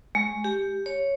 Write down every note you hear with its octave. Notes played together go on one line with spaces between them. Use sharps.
G#3
G4
C#5